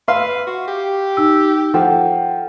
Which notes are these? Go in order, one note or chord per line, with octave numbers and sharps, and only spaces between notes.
B4 E5 F5 C6
F#4
G4
D#4 E6
F3 A4 F#5 G5